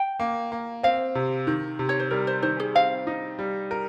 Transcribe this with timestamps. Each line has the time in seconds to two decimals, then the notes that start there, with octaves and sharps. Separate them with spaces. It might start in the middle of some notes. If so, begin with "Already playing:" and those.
Already playing: G5
0.20 A#3
0.52 A#3
0.83 C4 F5
1.15 C3
1.47 D#3
1.79 C3
1.89 C#5
1.99 C5
2.11 G3 A#4
2.27 C5
2.42 D#3 C5
2.60 G#4
2.75 C4 F5
3.07 D#4
3.39 G3
3.71 A#4